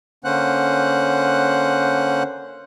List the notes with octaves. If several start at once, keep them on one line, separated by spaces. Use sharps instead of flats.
D3 A#3 C#4 C5 F#5 F#6